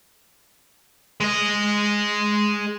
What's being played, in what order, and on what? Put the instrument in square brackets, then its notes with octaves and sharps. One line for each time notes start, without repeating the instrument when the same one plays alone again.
[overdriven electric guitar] G#3 D#5